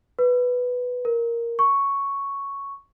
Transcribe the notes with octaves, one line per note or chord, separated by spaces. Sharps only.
B4
A#4
C#6